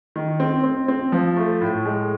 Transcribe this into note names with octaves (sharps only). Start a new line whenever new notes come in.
D#3
C4
C4
C4
F3
A3
A2
G#3